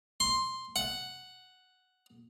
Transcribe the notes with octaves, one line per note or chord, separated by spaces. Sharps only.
C6
F#5